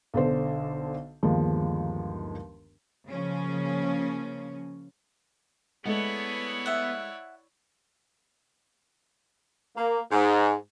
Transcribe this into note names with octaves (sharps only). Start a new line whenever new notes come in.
B1 D3 C5
G1 D#2 D#3 F3 G#3
C#3 F3 A#3 C#4
G#3 A3 B3 E4 A4 C#5 D5
E5 F#5
A#3
G#2